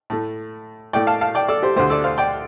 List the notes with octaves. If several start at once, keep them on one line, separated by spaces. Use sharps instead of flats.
A2 A3
A2 A3 D5 G5
F5 A5
F5 A5
D5 G5
A4 D5
G4 C5
D2 D3 A3 G4 C5
A4 D5
C5 F5
D5 G5